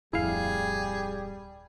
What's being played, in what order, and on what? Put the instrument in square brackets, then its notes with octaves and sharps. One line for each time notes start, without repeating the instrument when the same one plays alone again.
[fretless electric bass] D1 F2 [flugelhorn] G3 [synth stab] E4 F5 [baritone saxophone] G#4